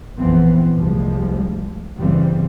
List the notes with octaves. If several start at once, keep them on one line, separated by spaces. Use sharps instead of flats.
A#1 F2 E3 B3 C4
F1 C2 F3 G3 G#3
G1 C#3 E3 G3 C4